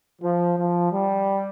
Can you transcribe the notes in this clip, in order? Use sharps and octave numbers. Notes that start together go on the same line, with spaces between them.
F3
F3
G3